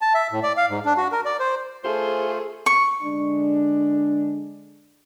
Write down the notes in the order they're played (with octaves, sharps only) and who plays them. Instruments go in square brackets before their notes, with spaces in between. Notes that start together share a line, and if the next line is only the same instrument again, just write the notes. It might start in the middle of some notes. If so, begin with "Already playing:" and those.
[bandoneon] A5
E5
A2
D5
F5
G#2
D4
F#4
A#4
D5
C5
[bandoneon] A3 F4 [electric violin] G#4 A4 [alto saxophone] C5
[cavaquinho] C#6
[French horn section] D3 G#3 D4